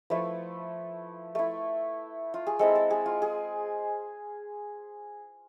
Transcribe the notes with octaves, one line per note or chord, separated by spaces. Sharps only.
F3 A3 E4 B4
A3 E4
F4
G#4
G#3 C4 E4 A4
A4
G#4
F4
G#4